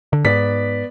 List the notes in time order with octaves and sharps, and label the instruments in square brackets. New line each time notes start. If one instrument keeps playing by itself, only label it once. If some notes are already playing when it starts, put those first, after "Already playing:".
[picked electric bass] D3
[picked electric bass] G#2 [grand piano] B3 D5 B6